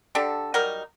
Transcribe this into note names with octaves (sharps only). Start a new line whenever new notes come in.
D3 D4 G4 A4
F#3 G3 D#4 A#4